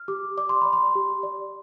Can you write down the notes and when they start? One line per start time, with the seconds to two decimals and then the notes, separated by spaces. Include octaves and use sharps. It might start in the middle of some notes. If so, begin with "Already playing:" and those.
Already playing: F6
0.08 G4 D6
0.37 D5 D6
0.49 C6
0.62 D5 B5
0.73 C6
0.95 G4
1.23 D5